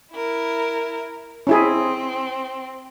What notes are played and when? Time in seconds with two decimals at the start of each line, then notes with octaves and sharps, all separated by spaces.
0.13 E4 A#4
1.47 C4 C#4 E4 G#4